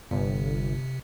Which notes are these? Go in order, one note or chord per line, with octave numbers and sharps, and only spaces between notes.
G1 C3